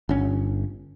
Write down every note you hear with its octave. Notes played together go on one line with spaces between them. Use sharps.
G1 C#4